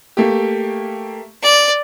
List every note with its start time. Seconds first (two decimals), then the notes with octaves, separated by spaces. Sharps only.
0.17 A3 A#3 G4
1.43 D5